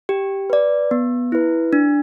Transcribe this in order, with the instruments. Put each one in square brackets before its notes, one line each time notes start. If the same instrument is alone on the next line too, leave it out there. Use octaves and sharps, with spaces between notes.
[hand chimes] G4
B4 D5
B3
E4 B4
D4